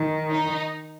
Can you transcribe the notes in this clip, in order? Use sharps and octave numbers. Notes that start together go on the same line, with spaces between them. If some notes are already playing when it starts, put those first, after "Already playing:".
Already playing: D#3
D#4